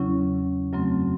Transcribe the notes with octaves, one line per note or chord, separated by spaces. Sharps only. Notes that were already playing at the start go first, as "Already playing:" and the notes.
Already playing: E2 C#3 F#3 C#4 E4
F#2 C#3 F#3 A3 C4